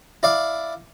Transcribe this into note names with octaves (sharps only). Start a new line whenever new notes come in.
E4 D5 F5